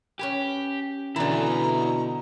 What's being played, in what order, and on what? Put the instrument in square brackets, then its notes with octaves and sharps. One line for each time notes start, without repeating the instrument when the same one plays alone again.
[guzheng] C#4 B4 G#5 [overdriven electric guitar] G4
[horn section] B2 [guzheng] D3 E3 [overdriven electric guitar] E4 D5 [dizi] A#5